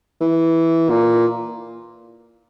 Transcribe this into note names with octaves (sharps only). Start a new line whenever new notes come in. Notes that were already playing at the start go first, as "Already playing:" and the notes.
E3
A#2